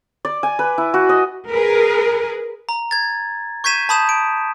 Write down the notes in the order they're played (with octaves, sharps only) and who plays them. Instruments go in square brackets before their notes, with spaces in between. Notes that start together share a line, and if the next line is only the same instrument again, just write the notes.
[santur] D5
G#5
B4
E4
F#4
D#5
[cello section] G#4 A#4 B4
[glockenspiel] A#5
G#6 A6
C#6 G6 G#6 B6 D#7 E7
A5 B5 D#6 G6 E7
D7